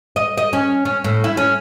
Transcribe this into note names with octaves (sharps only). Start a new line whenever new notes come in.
D#5
D#5
C#4
C#4
A2
E4
C#4